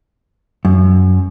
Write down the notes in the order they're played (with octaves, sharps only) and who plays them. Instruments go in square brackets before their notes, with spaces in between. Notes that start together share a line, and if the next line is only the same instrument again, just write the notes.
[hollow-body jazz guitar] F#2